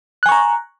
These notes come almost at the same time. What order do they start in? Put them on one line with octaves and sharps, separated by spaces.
F#6 G#5 C#6 A#5